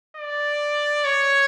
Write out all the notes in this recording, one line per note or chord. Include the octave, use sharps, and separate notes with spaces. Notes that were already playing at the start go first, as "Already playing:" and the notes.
D5
C#5